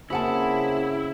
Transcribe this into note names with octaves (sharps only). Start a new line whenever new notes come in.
C#3 A#3 C4 E4 F#4 G#4 F#5 A5